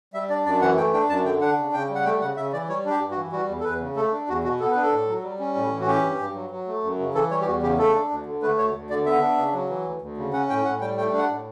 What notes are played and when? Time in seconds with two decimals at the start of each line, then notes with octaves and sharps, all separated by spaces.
0.13 G3 E5
0.30 D4 D5
0.46 F#2 D5
0.62 E3 F#5
0.77 A3 G5
0.93 D4 G5
1.09 F#2 A5
1.25 D3 G5
1.41 D4 F#5
1.57 C#3
1.73 C#3 G5
1.90 G3
1.95 F#5
2.05 A3 G5
2.21 C#3 F#5
2.37 C#3 E5
2.53 E3 D5
2.69 G3 C#5
2.85 D4 G4
3.01 G2
3.11 F#4
3.17 E3
3.32 G3 F#4
3.48 E2
3.60 A4
3.64 E2 B4
3.80 C#3
3.96 A3 A4
4.12 D4
4.28 E2 F#4
4.44 B2 F#4
4.60 B3 A4
4.71 D4 B4
4.82 A4
4.92 A2
5.08 F#3
5.23 G3
5.40 C#4
5.55 A2
5.71 E3
5.80 F#4
5.87 C#4 G4
6.03 G2
6.19 G2
6.35 F#3
6.50 F#3
6.67 A3
6.83 F#2
6.99 C#3
7.14 E3 A4
7.31 G3 C#5
7.41 G4
7.47 E2 F#4
7.62 C#3 G4
7.78 A3 A4
7.94 D4
8.10 D2
8.26 D3
8.42 A3 B4
8.58 D2 C#5
8.74 D2
8.90 D3 D5
9.06 B3 E5
9.22 D4
9.38 C#3
9.53 F#3
9.69 E3
9.85 D2
10.01 D2
10.17 C#3
10.33 C#4 F#5
10.49 A2 G5
10.65 A2 F#5
10.81 G3 G5
10.97 A3 G5
11.13 D4
11.18 F#5
11.29 A2